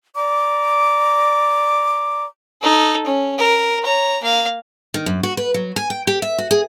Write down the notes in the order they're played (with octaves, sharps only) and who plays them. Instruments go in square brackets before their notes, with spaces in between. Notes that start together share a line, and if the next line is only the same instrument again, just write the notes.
[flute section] D5 A#5 D6
[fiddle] D#4 A4
C#4
A#4
C#5 A#5
A#3 F5
[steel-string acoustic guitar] D#3
F#2
F#4
B4
F#3
G#5
G5
G4
E5
F#4
G#4